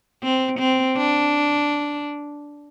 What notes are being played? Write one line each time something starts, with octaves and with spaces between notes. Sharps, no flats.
C4
C4
D4